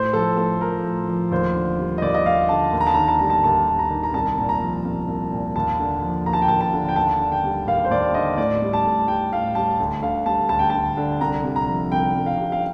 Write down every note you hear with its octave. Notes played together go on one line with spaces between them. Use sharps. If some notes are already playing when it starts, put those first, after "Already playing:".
Already playing: A2 C5
F3 A4
A2 A4
F3 A#4
A2
F3
D#2 C5
D3
G3
D#5
D#2 D5
D#5
D#2 F5
D3 A5
D#2
A#5
A5
D#3 A#5
A5
G3 A#5
A5
D#2 A5
D#2
A#5
D#3
A#5
C2 A5
A#2
A#5
F3
C2
C2
A#2
D#2 A5
D3
F3
D#2 A#5
A5
G5
D#2 A5
A5
D3
G5
D#2 A5
D3
G5
G3
D#2 F5
C5
D#2 D5
D3 D#5
A2 D5
G3
A5
A2
G3 G5
A2 F5
G3 A5
D2
D3 F5
G3 A5
D2 A5
G5
D2 A5
D3
C2 A#5
C3
A#5
F3
C2 G5
C2
F5
C3
F5